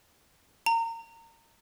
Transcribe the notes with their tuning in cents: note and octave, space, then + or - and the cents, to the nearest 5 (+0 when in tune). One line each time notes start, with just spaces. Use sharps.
A#5 -30